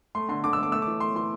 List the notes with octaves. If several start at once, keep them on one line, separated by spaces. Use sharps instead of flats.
A3 C6
D3 C6
D3 D6
E6
A3
D6
A3 E6
D6
E3
A3 C6
E3 C6